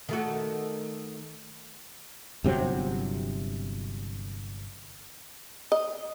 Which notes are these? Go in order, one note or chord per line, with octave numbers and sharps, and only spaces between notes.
D#3 A3 F#4
G1 C3 F#3 C4
D#5